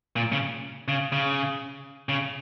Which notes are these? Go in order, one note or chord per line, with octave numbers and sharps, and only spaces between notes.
A#2
C#3
C#3
C#3
C#3